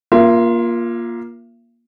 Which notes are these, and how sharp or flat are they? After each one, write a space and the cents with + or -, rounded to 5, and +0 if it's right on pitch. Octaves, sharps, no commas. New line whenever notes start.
A#3 +20 F4 +0 E5 +45